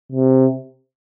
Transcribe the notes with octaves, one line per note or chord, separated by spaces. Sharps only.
C3